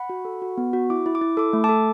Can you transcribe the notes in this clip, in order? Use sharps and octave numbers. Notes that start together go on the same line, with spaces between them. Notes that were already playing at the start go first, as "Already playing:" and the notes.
Already playing: F#5 B5
F#4
A4
F#4
B3
F#4
E4 D6
E4
D6
E4
A4 D6
A3
A5 D6
A4